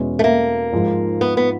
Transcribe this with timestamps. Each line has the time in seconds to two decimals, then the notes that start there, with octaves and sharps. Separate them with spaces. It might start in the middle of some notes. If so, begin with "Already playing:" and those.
Already playing: E2 B2 G#3 C#4 E4
0.19 A3
0.24 A#3
0.72 G#2 F3 G#3
1.21 B3
1.37 B3